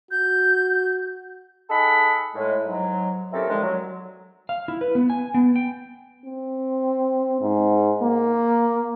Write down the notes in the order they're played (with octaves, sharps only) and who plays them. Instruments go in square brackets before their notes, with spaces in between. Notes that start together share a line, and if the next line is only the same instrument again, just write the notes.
[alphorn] F#4 [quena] G6
[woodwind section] D#4 G#4 A4 F#5 B5
A2 G#3
G#2 F#3
C4 C#4 E4 G4 A4 A#4
A#2 D3 D#3 F3 G#3
F#3
[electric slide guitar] F5
E4
B4
B3
G#5
B3
G5
[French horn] C4
G#2
A#3